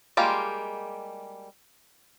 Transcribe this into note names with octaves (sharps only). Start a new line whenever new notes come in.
G3 G#3 A#3 F4 G4